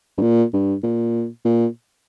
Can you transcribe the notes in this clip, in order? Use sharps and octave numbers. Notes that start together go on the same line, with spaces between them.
G2
A#2
G2
A#2
A#2